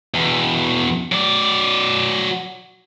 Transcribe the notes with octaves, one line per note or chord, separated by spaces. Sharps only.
E2 B2
F#3 D5